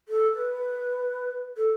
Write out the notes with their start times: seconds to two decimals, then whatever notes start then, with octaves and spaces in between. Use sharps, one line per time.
0.09 A4
0.34 B4
1.57 A4